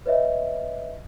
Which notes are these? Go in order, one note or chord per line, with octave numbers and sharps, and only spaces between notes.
B4 C#5 D#5 E5